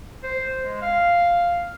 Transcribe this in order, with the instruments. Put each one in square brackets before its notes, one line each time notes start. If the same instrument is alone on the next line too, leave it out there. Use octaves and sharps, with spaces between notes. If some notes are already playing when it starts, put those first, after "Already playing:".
[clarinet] C5
G#3
F5